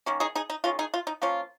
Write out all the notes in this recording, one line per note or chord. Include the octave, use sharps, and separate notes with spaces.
D#3 A#3 C#4
D#4 G#4
D#4 G#4
D#4
D#3 G#3 C#4 F4
D#4 G#4
F4
D#4
F3 A#3 C#4 F4